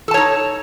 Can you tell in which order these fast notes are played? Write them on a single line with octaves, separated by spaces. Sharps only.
A4 A5 C#5 D#4